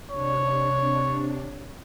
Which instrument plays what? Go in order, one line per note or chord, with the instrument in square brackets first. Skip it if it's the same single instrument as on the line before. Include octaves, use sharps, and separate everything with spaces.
[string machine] C3 D4 [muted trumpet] C#5